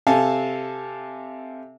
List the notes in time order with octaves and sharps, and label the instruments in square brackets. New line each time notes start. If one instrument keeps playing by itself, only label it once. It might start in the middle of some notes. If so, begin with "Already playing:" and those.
[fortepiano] C3 A4 F5 G#5 A5